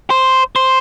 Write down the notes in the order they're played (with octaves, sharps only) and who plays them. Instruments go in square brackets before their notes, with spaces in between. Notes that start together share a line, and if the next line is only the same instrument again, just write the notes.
[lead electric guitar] C5
C5